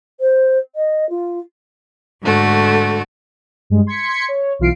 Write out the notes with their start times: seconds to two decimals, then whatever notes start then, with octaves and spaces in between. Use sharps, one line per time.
0.20 C5
0.75 D#5
1.09 F4
2.21 G#2 D3 A3 F#4
3.70 G2 G#3
3.87 C6 G#6 B6 C#7
4.28 C#5
4.59 B1 E3 F4 F5 C7 D7